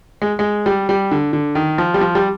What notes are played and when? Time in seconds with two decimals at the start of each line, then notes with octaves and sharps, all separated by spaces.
0.22 G#3
0.39 G#3
0.66 G3
0.89 G3
1.11 D3
1.33 D3
1.55 D#3
1.78 F3
1.94 G3
2.01 F3
2.15 G3